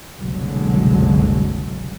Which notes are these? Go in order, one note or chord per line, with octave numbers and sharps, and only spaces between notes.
F#1 C2 B2 D3 F#3 G#3